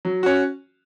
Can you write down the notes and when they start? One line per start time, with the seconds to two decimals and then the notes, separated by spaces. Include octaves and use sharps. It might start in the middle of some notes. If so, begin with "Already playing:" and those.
0.05 F#3
0.23 C#4 F#4